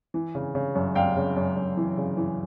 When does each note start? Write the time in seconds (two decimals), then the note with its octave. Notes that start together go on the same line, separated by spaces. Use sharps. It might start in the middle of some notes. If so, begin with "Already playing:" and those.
0.14 E3
0.35 C#3
0.55 C#3
0.75 F#2
0.95 F#2 F5 G5
1.17 C#3
1.36 F#2
1.56 F#2
1.77 E3
1.98 C#3
2.17 E3